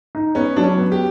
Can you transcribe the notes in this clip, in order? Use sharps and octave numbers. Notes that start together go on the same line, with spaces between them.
D#4
B3 C#4
F#3 D4
C#4
B3
G4